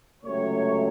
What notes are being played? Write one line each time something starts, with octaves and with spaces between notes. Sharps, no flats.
C#2 C3 F#3 A3 C#4 C#5